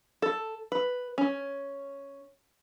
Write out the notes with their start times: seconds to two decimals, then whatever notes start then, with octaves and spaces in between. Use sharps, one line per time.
0.22 A4
0.72 B4
1.18 C#4